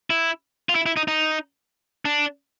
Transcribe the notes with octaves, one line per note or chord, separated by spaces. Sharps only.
E4
F4
E4
E4
D#4
D#4
D4